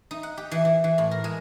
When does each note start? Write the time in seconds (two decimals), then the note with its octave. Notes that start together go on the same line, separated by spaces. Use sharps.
0.11 D#4
0.23 F#5
0.37 G4
0.51 E3
0.65 E3
0.84 E3
0.98 A2
1.11 A#4
1.24 G#3